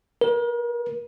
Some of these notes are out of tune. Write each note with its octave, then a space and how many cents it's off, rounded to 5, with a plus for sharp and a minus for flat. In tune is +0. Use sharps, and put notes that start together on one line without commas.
A#4 +40